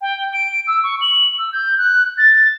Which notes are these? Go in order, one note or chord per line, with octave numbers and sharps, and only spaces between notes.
G5
D7
E6
C#6
F#7
E6
G6
F#6
A6